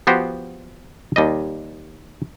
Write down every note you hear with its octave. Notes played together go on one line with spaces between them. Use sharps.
F3 B3 F#4 G4 C5
D#2 G3 D#5